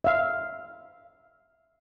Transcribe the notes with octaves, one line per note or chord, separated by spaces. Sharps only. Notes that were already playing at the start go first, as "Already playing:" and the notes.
E5 F5